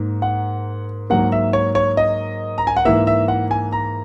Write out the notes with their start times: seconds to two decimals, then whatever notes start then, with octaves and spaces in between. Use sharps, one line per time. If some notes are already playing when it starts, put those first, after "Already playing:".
Already playing: G#2 A#3
0.22 F#5
1.10 G#2 F#3 A#3 F#5
1.32 E5
1.53 C#5
1.75 C#5
1.97 D#5
2.58 A#5
2.67 G#5
2.76 F#5
2.85 G#2 E3 A#3 E5
3.07 E5
3.28 F#5
3.51 G#5
3.72 A#5